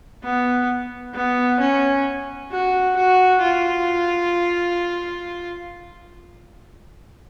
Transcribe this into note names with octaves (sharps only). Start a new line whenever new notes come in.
B3
B3
C#4
F#4
F#4
F4